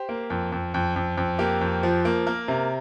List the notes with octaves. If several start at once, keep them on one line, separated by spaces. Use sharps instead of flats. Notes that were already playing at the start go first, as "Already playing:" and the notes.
Already playing: G4 C5
A#3
F2
F2
F2
F2
F2
A#3 G4
F2
F3
A#3
A#3 A#4
C3